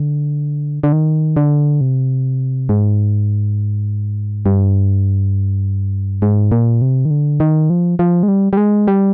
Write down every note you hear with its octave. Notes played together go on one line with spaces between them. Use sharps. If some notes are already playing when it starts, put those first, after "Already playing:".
Already playing: D3
D3
D#3
D3
C3
G#2
G2
G#2
A#2
C3
D#3
D3
D#3
F3
F3
G#3
G3
G3
G#3
G3